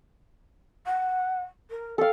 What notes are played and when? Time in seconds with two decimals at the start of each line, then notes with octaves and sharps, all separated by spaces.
0.86 F#5
1.70 A#4
1.98 A4 F5 G5